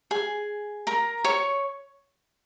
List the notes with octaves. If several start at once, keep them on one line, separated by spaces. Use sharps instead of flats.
G#4 G#5
A#4 A#5
C#5 C#6